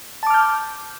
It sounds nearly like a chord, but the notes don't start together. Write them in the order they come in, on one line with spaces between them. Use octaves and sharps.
A5 D6 F6 G6